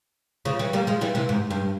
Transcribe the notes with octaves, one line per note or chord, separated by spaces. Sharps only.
C#3 F3
E3 G3
G3 A#3
F3 G#3
E3 G3
C3 E3
G#2
G2